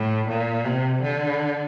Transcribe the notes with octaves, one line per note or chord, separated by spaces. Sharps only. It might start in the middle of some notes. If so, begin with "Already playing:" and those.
Already playing: A2
A#2
C3
D3